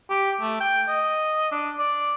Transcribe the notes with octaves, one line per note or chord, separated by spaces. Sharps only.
G4
A3
G5
D#5
D4
D5